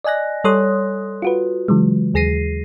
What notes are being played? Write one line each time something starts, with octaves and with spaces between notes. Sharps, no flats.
D5 D#5 G#5 F#6 A#6
G3 A4 C#5 C6 D#6 F#6
F4 F#4 B4
C#3 E3 F#3 G#3
D#2 G#4 A#6 C7 D#7